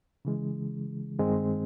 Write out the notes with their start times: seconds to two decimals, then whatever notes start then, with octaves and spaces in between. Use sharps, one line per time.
0.25 C#3 E3 G#3
1.19 G2 D#3 G#3 C4